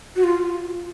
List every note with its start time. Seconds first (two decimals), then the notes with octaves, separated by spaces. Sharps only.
0.16 F#4
0.24 F4